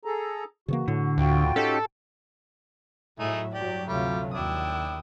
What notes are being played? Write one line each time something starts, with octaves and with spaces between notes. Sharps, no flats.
G#4 A4 A#5
C#3 E3 A#3 F#4
A2 D3
D2 F4 F#4 G5
C#4 D#4 G4 A4
A2 F#3 A3 D#4 G#4 E5
G2 F#3 G4 D5
D2 C3 G3 A3 F4
D#2 D4 E4 G5 D#6